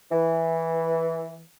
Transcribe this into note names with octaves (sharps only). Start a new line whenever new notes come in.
E3